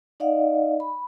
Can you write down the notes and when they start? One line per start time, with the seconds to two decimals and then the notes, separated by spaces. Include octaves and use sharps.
0.20 D#4 D5 D#5 F5 F#5
0.80 B5